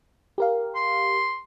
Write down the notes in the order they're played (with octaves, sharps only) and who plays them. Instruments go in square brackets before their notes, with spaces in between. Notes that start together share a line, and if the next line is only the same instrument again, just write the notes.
[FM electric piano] G4 A#4 F5
[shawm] C6